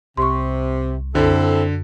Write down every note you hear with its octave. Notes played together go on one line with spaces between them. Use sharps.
C2 C3 C6 C#6
F#2 D3 C4 E4 A4